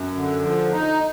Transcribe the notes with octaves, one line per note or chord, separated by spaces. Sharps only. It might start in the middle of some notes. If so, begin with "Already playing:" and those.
Already playing: F#2
D3
F3
D#4